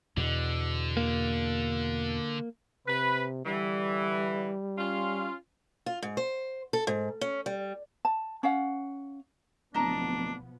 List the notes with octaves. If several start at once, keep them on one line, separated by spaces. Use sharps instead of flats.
E2 B2 D3
A#3
C3 B4
D3 E3 G3
C#4 F4
F4
G#2
C5
A4
G#2
C#4
G3
A5
C#4 F5 F#5
D1 B2 F3 B3 D4 D#5 A5 A#5